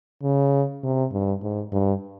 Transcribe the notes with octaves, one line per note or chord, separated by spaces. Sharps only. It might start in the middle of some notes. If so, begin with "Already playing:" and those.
C#3
C3
G2
G#2
G2